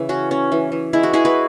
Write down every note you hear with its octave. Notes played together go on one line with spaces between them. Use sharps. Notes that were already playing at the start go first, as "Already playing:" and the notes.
Already playing: C#3 E3
C#4 F#4
C#4
E3
E3
G#3 E4
F#4
G#3 E4 G#4
F#4 B4